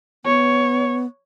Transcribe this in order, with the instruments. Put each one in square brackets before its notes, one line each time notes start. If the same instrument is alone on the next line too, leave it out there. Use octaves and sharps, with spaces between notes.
[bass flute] B3 [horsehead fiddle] C#5